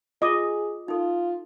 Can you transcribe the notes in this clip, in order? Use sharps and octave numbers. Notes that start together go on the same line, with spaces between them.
F4 G#4 D#5 D6
D#4 F4 A4